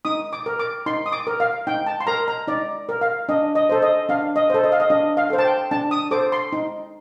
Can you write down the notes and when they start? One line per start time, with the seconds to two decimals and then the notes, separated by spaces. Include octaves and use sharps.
0.05 D#4 D#6
0.33 D6
0.46 A#4
0.59 D6
0.86 D#4 C6
1.06 D#6
1.12 D6
1.27 A#4
1.40 F5
1.67 D#4 G5
1.87 A5
2.00 C6
2.07 A#4 A#5
2.28 A#5
2.48 D#4 D5
2.89 A#4
3.01 F5
3.29 D4 D#5
3.55 D#5
3.69 A4 C5
3.82 D#5
4.09 D4 F5
4.36 D#5
4.50 A4 C5
4.64 D#5
4.72 F5
4.80 D#5
4.90 D4 D#5
5.17 F5
5.30 A4 C5
5.39 A5
5.45 G5
5.71 D4 A5
5.91 D#6
6.11 A4 C5 D6
6.32 C6
6.53 D#4